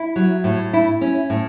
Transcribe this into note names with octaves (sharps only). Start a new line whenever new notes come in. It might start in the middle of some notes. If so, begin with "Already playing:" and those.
Already playing: E4
F#3
A2
E4
C#4
A2